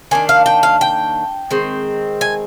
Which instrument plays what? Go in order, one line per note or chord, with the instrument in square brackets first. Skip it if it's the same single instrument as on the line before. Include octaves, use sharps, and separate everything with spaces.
[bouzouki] D#3 A#3 D4 G#5
F5
G5
F5
G5
D#3 G#3 C4
G#5